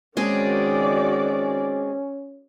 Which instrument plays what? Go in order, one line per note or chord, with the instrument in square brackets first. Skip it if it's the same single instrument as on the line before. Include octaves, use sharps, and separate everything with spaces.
[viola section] D#3 F#4 D5 [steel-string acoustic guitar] G#3 C4 G#4 [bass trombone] C#4